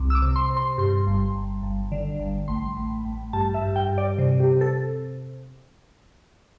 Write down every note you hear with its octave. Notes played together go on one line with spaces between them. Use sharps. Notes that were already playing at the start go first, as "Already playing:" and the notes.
Already playing: C2
E6
D6
C3
C6
C3
C6
G2 C6
G1
G1
G1
D3
G1
A1 C6
A1
A1
G2 A5
E5
G2
G5
G2
D5
C3
G4
C3
A4